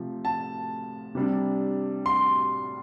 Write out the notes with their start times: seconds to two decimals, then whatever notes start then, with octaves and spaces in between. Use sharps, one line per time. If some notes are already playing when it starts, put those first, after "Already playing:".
Already playing: C3 F3 A3
0.25 A5
1.15 C3 G3 D4
2.06 C6